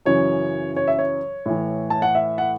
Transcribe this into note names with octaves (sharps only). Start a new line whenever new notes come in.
F#2 C#3 E3 C#5
C#5
E5
C#5
A2 E3
A5
F#5
E5
F#5